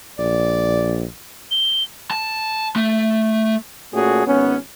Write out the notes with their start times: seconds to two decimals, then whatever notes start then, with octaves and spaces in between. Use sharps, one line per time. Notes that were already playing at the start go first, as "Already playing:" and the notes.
0.19 A#1 D5
1.51 G7
2.11 A5
2.76 A3
3.93 A#2 A3 C#4 F#4 G#4
4.27 G#1 B3 C#4